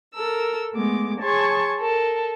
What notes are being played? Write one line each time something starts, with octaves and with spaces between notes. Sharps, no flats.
A4 A#4 E6
G#3 A3 B3 D6
G#4 C#5 A5 C6 C#6 G#6
A4 A#4